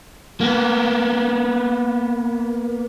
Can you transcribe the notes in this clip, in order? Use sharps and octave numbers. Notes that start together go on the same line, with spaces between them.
A#3 B3